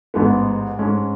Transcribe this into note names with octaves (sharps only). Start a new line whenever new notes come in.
A1 G#2 G#3 B3
G#2 G#3 C#4